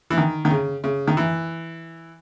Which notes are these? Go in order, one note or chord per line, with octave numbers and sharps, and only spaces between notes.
E3
D#3
D#3
C#3
C#3
D#3
E3